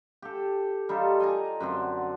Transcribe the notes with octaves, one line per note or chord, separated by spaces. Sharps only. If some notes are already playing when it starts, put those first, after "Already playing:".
G4 A4
G3 D#4 F4 A4
D#5 G#5 A#5
F#2 D3 C4